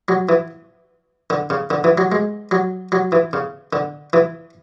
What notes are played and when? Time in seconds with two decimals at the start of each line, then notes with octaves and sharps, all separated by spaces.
0.08 F#3
0.29 E3
1.30 D3
1.50 C#3
1.70 D3
1.84 E3
1.98 F#3
2.12 G#3
2.51 F#3
2.92 F#3
3.12 E3
3.33 C#3
3.73 D3
4.13 E3